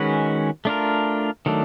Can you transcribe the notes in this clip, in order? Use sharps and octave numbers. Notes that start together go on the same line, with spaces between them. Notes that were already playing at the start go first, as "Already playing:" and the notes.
Already playing: D#3 G#3 C#4 F#4 B4
A3 D4 F4 A#4
D#3 F#3 A3 D4